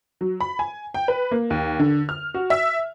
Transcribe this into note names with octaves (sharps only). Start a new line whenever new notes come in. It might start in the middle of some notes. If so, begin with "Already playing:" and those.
F#3
B5
G#5
G5
B4
A#3
D#2
D3
F6
F#4
E5